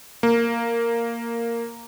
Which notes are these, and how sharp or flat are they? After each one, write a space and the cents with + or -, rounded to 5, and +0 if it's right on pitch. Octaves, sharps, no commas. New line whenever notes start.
A#3 -5